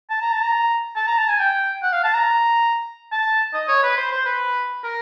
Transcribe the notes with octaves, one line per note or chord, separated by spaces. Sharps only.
A5
A#5
A5
A#5
A5
A#5
A5
G#5
G5
F#5
F5
A5
A#5
A5
D#5
C#5
B4
C5
C5
B4
A#4